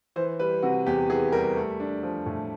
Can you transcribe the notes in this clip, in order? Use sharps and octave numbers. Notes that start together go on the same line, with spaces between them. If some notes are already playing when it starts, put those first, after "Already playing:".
E3 C5
G3 B4
C3 F#4
E2 G4
E3 G#4
G3 A#4
A3
D4
F3
A2